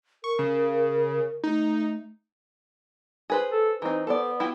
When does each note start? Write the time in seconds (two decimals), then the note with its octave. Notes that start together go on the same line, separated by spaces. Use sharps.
0.24 A#4 C#6
0.39 C#3
1.43 A3 D#4
3.30 G#4 B4 C5
3.52 A4
3.82 E3 C4 D#4
4.07 B3 A4 C5 D5
4.40 E4 F4 G4